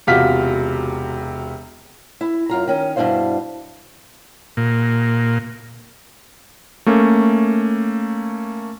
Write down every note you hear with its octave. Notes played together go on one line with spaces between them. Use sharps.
E1 C3 F4 F#4 F6 B6
E4
F#2 F4 A#5
D#3 C#4
G2 B2 D4 E4 C5 F5
A#2
A3 A#3 C#4